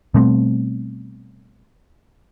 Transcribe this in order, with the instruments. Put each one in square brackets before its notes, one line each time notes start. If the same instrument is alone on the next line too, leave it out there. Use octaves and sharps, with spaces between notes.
[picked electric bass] B2 G3 A3 C4